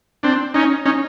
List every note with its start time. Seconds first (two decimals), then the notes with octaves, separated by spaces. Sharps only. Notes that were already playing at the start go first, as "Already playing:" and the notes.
0.23 C4 D4
0.54 C#4 D#4
0.86 C#4 D#4